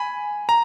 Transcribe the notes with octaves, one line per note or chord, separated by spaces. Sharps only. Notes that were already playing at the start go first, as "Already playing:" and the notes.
Already playing: G#5 B5
A#5